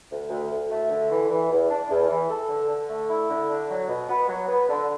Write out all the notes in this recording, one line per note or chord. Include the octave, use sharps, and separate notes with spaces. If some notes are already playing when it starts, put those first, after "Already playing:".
D2
D2
D2
A3
D3
E3
E3
E2
D4
E2
E3
A4
D3
D3
A3
E4
D3
D4
F#3
B2
B3
F#3
B3
D3